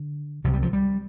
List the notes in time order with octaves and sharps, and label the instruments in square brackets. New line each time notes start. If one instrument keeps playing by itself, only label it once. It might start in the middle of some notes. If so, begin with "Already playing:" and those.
Already playing: [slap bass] D3
C2 C3 F3
G3
F3
G3